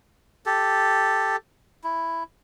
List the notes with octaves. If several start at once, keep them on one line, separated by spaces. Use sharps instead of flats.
G4 A4
E4